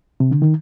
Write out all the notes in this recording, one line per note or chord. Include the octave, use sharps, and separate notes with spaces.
C3
D3
D#3